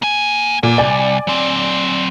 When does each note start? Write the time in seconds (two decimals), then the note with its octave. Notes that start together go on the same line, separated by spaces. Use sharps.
0.02 A#3 G#5
0.63 A#2 F#5 G#5
0.78 C2 D5 G#5
1.27 F#3 C4